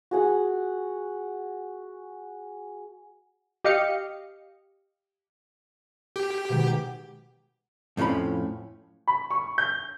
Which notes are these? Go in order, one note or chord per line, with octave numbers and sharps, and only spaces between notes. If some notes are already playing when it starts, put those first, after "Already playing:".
F#4 G#4 F#5
G4 D#5 F5 C#7
G4
B2 D#3 G#3
F2 A2 F3 C#4 B5
B5
C#6
G6